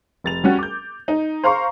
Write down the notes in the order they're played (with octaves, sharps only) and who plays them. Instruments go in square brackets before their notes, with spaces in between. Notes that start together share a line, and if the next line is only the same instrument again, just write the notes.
[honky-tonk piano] F1 A6 F7
G3 C#4 F#4
D6 G6
D#4
C5 F5 A#5 C6 C#6